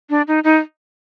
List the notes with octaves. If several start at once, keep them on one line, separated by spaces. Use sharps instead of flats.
D4
D#4
D#4